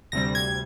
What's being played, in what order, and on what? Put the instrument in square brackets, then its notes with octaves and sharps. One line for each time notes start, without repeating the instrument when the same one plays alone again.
[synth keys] D2 C3 G3 A#6
G#6